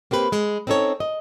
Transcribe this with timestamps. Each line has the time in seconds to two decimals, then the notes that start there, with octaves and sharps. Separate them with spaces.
0.11 A#3 C4 G4 B4
0.32 G#3
0.67 C4 C#4 D#4 A4 C#5
1.00 D#5